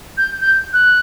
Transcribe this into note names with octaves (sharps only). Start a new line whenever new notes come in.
G6
G6
F#6